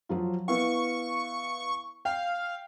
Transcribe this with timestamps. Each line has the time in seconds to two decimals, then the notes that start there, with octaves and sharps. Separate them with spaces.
0.09 F3 F#3 F4
0.48 B3 E4 F5 C#6
2.05 F5 G5